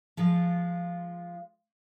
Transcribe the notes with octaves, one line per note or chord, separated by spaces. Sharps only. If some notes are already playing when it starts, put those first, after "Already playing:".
F3 G#3 F4